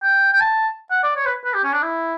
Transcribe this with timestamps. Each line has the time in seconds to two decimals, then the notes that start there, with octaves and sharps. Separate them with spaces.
0.02 G5
0.33 G5
0.40 A5
0.90 F#5
1.03 D5
1.16 C#5
1.26 B4
1.44 B4
1.54 G4
1.64 C#4
1.73 D4
1.82 E4